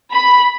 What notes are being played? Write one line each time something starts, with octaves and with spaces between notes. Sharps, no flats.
B5